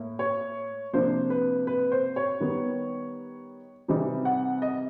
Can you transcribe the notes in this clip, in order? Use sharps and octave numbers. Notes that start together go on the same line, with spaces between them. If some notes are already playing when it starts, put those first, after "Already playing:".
Already playing: A2 A#3
C#5
C3 F3 A#3 D4 C5
B4
B4
C5
C#5
D#3 G3 B3
C3 E3 G3 C4 D#4
F#5
D#5